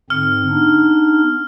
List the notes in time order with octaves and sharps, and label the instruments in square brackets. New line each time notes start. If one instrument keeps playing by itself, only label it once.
[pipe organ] G#2 D3 C4 [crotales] F6
[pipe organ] B3 D4 D#4